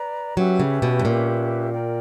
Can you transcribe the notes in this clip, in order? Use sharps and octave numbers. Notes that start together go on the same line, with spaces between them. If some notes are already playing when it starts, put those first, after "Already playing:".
Already playing: B4 D5 A#5
F#3 C#4 G4 B4 E5
C#3
B2
G2
A#2
A#4 D5 G5